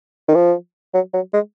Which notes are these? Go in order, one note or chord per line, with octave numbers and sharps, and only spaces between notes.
D#3
F3
F#3
F#3
G#3